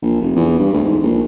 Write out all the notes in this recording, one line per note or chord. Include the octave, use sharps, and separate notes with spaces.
A#1
F1
E2
G2
D2
G#2
A#1